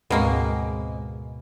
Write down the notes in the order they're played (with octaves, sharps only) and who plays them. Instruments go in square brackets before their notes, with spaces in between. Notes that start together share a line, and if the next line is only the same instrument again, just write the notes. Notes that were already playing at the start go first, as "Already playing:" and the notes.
[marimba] D2 G#2 [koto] B2 A#3 [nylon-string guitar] G#3 C4